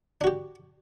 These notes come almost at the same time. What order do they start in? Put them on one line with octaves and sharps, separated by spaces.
D4 F#4 G4